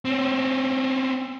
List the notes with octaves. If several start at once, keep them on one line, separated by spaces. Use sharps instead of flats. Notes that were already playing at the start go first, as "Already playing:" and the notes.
C4 C#4